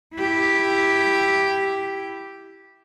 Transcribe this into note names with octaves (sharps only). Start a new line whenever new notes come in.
E4 G4